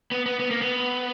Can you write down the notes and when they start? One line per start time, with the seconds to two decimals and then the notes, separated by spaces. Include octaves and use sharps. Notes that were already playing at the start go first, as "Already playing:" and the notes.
0.12 B3
0.26 B3
0.39 B3
0.51 A#3
0.62 B3